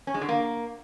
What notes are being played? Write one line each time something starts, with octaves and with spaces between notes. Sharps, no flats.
C#4
G#3
D3
A#3